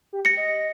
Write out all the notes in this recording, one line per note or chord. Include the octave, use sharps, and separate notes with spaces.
G4
A#6 C#7
D#5